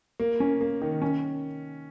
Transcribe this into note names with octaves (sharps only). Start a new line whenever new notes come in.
A#3
C#4
A#3
D#3
C#4